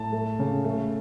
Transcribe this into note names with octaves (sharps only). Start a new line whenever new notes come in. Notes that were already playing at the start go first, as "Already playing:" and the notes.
Already playing: A2 A5
A3
C#3
A3